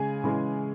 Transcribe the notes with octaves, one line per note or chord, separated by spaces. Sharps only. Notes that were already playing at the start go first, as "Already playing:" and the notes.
Already playing: C#3 G#3 G#4 G#5
C#3 E3 G#3